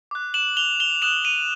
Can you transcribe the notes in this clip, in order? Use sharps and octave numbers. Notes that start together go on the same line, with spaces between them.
D6 F#6
E7 F#7
F7 G7
F7 G7
D#6 F#6 E7 F#7
D#7 F7